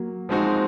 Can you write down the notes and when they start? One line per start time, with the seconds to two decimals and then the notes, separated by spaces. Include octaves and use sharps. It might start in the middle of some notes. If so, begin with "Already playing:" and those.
Already playing: F#3 A#3
0.29 F3 G#3 C4 D#4 F#4